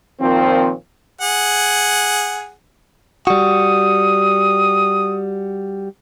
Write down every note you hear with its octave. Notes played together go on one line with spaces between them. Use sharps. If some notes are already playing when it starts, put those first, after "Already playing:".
A#2 D#3 F3 C4
G#4 F#5
G3 F#4 D#6